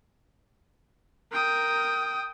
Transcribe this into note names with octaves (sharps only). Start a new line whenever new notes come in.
A#4 G5 D#6